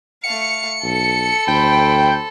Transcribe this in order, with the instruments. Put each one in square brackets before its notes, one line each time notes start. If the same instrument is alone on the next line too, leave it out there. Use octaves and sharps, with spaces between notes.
[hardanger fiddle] A3 F5 [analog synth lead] C#7
[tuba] B1 [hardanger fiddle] A4
[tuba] D2 [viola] C5 B5 [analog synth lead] G5